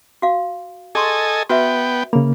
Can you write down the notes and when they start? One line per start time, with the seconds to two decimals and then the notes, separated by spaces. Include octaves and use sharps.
0.22 F#4 F5
0.95 G#4 A4 D#5 G#5 C6 C#6
1.50 B3 F#4 B4 E5 G5
2.13 C#3 A#3 B5